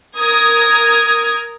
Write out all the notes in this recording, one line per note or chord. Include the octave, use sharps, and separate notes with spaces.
A#4 D#6 G#6